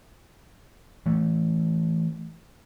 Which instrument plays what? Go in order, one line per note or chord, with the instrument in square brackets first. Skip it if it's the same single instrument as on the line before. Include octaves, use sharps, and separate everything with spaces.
[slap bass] E3 A3